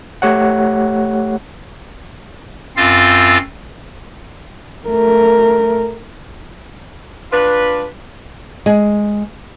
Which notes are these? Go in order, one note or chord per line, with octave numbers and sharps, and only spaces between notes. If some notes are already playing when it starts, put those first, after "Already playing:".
A3 G4 C#5 F#5
F#2 C4 F4 F5 E6 A6
A3 A#4
D4 F4 B4
G#3